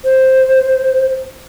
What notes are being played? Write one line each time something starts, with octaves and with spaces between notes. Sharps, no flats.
C5